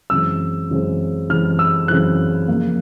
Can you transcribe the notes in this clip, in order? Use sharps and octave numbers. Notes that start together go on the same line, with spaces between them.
F#2 C#3 E3 G#3 C4 E6
F#2 C#3 E3 G#3 C4
F#2 C#3 E3 G#3 C4 F6
E6
F#2 C#3 E3 G#3 C4 F#6
C#3 F3 A#3